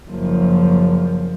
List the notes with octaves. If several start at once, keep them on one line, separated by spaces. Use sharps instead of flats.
F#1 F3